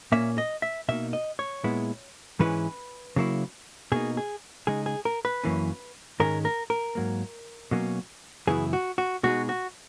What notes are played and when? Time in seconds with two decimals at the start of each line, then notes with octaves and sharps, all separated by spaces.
0.12 A#2 A#3 C#4 E5
0.38 D#5
0.62 E5
0.88 B2 A#3 D#4 E5
1.13 D#5
1.39 C#5
1.64 A#2 G#3 B3 E4
2.39 G#2 E3 G#3 C#4 E4 B4
3.16 C#3 F#3 A#3 E4
3.92 B2 A#3 D#4 G#4
4.17 G#4
4.67 C#3 G#3 D#4 G#4
4.86 G#4
5.05 A#4
5.25 B4
5.44 F#2 E3 A#3 C#4
6.20 G#2 D#3 G#3 C#4 A#4
6.45 A#4
6.70 A#4
6.95 G#2 F#3 A#3
7.71 B2 F#3 A#3 C#4
8.47 F#2 C#3 E3 B3 E4 G#4
8.73 F#4
8.98 F#4
9.23 B2 G#3 D#4 F#4
9.49 F#4